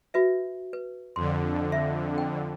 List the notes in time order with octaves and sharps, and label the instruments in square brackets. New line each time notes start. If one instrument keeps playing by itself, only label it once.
[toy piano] F#4 B4 E5
B4
[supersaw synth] F2 D3 [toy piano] C6
[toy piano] E5
G5